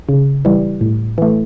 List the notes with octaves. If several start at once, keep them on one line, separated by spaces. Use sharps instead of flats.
C#3
E3 G3
A2
E3 A3